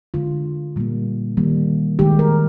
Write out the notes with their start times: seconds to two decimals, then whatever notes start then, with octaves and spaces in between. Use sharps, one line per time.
0.14 D3 G#3 F4
0.76 A#2 G3 A#3
1.37 D#3 G3 A#3
1.99 D#3 G#3 G4
2.19 A#4